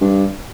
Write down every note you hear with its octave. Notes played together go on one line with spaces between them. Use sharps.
G2